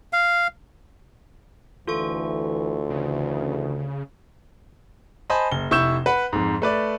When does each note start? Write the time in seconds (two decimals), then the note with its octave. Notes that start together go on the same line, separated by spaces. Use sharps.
0.13 F5
1.88 D2 E3 F4 A4 C#6
2.90 C#3 E3
5.30 C5 D#5 G#5 A5 B5
5.51 F#1 G7
5.71 F1 E4 C#6 E6 G6 E7
6.06 B4 F#5 B5
6.33 F2 G#2
6.62 A3 B4 D5